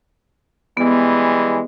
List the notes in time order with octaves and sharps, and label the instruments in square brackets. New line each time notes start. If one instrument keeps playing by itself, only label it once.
[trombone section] E3 G3 G#3 [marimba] B3